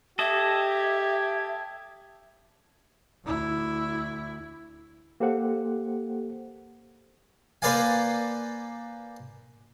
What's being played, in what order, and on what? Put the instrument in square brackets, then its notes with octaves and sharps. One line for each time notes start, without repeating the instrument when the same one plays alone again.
[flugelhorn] G4 [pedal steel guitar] A4 D#5 [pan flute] E5 [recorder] G#6
[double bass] D2 E4
[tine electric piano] A#3 G4 A4 C5 F#5
[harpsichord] A#3 B4 C5 D5 F5 G#5